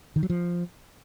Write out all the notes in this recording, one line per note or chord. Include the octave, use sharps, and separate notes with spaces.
D#3
F#3
F3